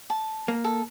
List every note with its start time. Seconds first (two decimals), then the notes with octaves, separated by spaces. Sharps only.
0.10 A5
0.48 A#3
0.64 A4